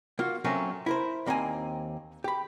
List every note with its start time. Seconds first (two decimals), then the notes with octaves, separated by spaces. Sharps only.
0.19 A#3 F4 F#4
0.44 F#3 A3 A#3 C4 C#4
0.86 E4 A#4 C5
1.26 D#2 A#3 C4 C5 G#5 A#5
2.24 G4 B5